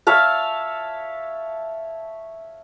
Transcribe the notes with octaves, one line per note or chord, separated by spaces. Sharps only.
C#5 E5 F5 A5